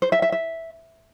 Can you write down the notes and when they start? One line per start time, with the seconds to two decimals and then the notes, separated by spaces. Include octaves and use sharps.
0.02 C5
0.12 E5
0.22 E5
0.32 E5